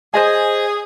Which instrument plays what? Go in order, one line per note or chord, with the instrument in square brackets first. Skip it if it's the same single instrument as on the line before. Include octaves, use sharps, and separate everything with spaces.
[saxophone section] G#4 [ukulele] C5 D#5 G#5